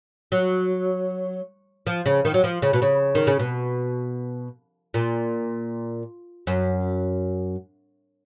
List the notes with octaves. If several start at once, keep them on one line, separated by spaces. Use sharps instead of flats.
F#3
F3
C#3
D#3
F#3
F3
C#3
B2
C#3
D#3
C#3
B2
A#2
F#2